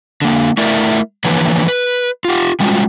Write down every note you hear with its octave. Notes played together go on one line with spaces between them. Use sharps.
D3 A#3
A3 E4 A#4 D5 E5
D3 E3 F3 A#3 B4 C#5
B4
F4 G4
G3 G#3 C#4 F4 F#4